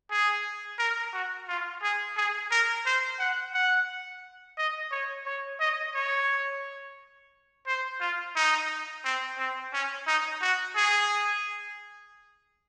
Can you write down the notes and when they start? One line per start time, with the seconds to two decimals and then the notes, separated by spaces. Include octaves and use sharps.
0.11 G#4
0.79 A#4
1.13 F#4
1.48 F4
1.82 G#4
2.17 G#4
2.51 A#4
2.86 C5
3.19 F#5
3.54 F#5
4.57 D#5
4.91 C#5
5.26 C#5
5.60 D#5
5.94 C#5
7.67 C5
8.01 F4
8.35 D#4
9.04 C4
9.38 C4
9.73 C#4
10.07 D#4
10.42 F#4
10.76 G#4